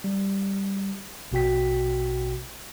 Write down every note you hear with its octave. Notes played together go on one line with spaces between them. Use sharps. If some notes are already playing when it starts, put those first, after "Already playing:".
G3
A#1 B2 F#4 G5 B6